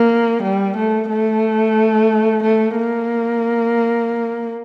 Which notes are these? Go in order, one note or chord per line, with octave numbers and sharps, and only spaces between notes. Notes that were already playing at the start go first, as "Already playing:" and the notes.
Already playing: A#3
G3
A3
A3
A3
A#3